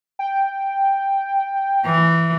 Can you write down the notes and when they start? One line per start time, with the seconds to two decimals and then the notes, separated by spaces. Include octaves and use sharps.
0.19 G5
1.86 E3